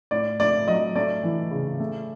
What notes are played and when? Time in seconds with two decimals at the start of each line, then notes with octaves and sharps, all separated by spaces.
0.11 A2 D5
0.40 A3 D5
0.67 F#3 D#5
0.96 A3 D5
1.23 E3
1.51 C#3
1.80 A3